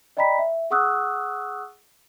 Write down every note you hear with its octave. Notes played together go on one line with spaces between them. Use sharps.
D5 D#5 G5 A#5 B5 B6
E5
G#4 F#5 C#6 D#6 E6 F#6